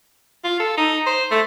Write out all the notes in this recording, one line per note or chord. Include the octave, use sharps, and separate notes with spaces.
F4
A4
D#4
C5
A3